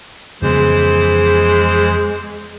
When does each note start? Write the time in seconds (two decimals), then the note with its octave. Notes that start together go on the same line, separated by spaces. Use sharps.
0.42 F2 C#3 E3 G#3 B3 C5